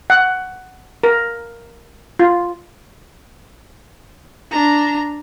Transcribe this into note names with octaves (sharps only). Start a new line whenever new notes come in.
F#5
A#4
F4
D4 A#5